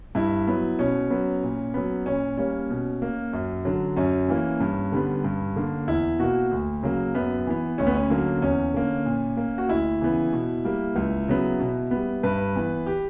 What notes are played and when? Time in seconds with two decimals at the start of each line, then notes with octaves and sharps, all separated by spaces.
0.15 G2 E4
0.48 F#3 B3
0.79 B2 C#4
1.11 F#3 B3
1.43 A#2
1.74 F#3 B3
2.06 A#2 C#4
2.37 G3 A#3 C#4
2.70 B2
3.02 A#3
3.33 F#2
3.65 D3 F#3
3.96 F#2 C#4
4.29 E3 A#3
4.60 G2
4.92 D3 G3 B3
5.24 G2
5.56 D3 A#3
5.87 E2 E4
6.19 B2 A#3 F#4
6.51 D2
6.83 C#3 F#3 A#3
7.15 F#2 B3
7.47 E3 B3
7.78 D2 C#4
7.87 B3
7.94 C#4
8.10 D3 F#3 A#3
8.42 E2 C#4
8.74 D3 A#3
9.06 A#2
9.37 A#3
9.58 F#4
9.68 D2 E4
10.01 C#3 E3 B3
10.33 B2
10.65 G3 A#3
10.96 C#2
11.28 C#3 F#3 B3
11.60 B2
11.91 G3 B3
12.23 G2 B4
12.55 E3 B3
12.86 G4